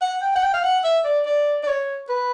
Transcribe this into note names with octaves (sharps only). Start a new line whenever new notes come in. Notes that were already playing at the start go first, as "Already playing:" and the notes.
F#5
G5
F#5
G5
F5
F#5
E5
D5
D5
D5
C#5
B4